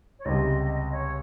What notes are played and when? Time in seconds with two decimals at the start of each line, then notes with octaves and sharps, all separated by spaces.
0.18 C#5
0.25 C#2 C3 G3 D#5
0.91 C#5